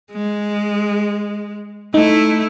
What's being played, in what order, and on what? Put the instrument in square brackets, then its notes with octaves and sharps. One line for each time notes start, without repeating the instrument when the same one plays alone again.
[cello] G#3
[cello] A3 E4 [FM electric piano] D#4